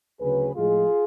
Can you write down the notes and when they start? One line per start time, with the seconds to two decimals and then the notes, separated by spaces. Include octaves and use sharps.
0.20 D2 C#3 F#3 G#4 B4
0.55 A2 F3 G#3 F4 G#4